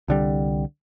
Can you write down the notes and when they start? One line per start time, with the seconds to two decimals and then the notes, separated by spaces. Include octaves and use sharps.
0.08 C2 D3 G3